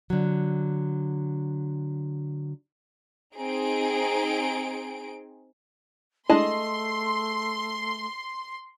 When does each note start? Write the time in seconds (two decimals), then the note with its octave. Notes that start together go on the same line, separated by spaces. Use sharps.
0.10 D3 F#3
3.35 C4 D#4 G#4 D7
6.30 G#3 A3 D4 E4 G#4 D#5 A5 C6